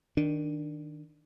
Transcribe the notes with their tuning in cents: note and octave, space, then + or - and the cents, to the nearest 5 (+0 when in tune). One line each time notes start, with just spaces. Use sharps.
D#3 +0 D4 +15